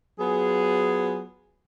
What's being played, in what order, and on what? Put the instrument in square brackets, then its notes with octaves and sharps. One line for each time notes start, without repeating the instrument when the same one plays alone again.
[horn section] F#3 B3 F4 G#4